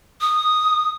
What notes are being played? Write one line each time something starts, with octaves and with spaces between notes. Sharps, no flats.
D#6